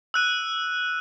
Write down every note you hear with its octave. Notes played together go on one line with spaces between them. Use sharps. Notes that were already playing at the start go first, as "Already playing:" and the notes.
E6 F#6 D#7